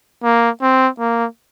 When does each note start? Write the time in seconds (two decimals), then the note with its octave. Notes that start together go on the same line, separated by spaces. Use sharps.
0.23 A#3
0.62 C4
0.99 A#3